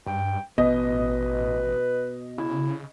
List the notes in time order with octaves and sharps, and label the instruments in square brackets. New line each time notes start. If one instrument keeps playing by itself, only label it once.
[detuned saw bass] G2 [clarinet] G5
[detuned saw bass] A1 [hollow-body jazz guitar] B2 [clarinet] B4 [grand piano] D#5
[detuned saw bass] C#3 [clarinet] E4